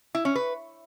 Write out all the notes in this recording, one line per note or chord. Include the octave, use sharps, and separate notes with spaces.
E4
C#4
B4